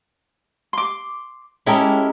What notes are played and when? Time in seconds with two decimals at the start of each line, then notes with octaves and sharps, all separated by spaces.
0.73 C6 D6
1.66 G#3 C#4 E4 G4 A4 A#4